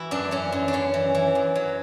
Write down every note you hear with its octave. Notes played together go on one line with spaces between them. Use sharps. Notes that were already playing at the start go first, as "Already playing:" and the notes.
Already playing: E3 E4 F#4
F#2 D4
E3 C#4
F#2
D4
F#2 C#4
E3
E3
F#2
F#3